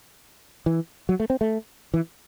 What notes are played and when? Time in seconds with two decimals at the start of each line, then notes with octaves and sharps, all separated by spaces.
0.66 E3
1.09 F#3
1.20 A3
1.30 C4
1.41 A3
1.94 E3